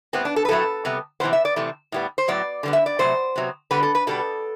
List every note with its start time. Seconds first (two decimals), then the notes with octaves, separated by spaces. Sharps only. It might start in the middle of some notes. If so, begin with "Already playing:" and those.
0.13 A2 G3 B3 C4
0.25 D4
0.36 A4
0.45 B4
0.49 A2 F#3 A3 A4
0.85 C3 G3 B3
1.20 C3 E3 G3 B3 C5
1.33 E5
1.45 D5
1.56 C3 E3 A3
1.92 A2 G3 B3
2.18 C5
2.28 A2 F#3 B3 D5
2.63 D3 G3 B3
2.73 E5
2.86 D5
2.99 C3 F#3 A3 C5
3.36 C3 F#3 B3
3.71 D3 G3 B3 B4
3.83 A4
3.95 B4
4.07 B2 G3 B3 A4